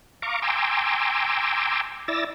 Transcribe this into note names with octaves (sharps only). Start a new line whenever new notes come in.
F5 A#5 C#6 D6
G5 G#5 A#5 C6 D6 E6
E4 D5 E6 A6 A#6